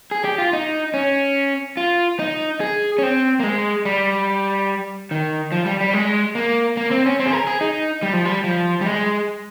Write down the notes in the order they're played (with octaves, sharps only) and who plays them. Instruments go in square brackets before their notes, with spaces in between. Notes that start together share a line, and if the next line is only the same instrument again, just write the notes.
[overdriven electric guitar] G#4
G4
F4
D#4
C#4
F4
D#4
G#4
C#4
C4
A#3
G#3
G3
D#3
F3
G3
G3
G#3
A#3
A#3
C4
C#4
C4
G#4
A#4
G#4
D#4
G3
F3
G3
F3
G3
G#3